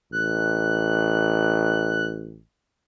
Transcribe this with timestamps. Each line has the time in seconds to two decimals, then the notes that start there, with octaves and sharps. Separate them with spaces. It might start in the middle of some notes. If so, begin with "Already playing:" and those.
0.12 A1 F#6